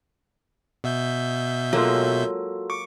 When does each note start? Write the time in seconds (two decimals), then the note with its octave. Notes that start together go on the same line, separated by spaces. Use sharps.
0.84 B2 E5 G6
1.73 F#3 G#3 A#3 F4 F#4 A4
2.70 C#6 D6